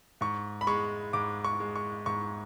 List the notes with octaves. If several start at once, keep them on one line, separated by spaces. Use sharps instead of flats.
G#2 C#6
B5
G#3 C#6
G#2 D6
C#6
G#3
C#6
G#2 C#6